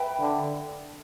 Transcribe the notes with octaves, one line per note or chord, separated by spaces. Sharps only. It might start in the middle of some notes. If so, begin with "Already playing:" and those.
Already playing: B4 E5 G5 B5
D3